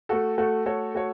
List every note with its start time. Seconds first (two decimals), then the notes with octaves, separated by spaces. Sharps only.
0.09 A3 F#4 A4
0.38 A3 F#4 A4
0.66 A3 F#4 A4 C#5
0.95 A3 F#4 A4 C#5